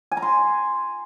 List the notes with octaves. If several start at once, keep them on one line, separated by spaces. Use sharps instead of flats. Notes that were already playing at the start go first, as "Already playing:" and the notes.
G#5
A#5
C6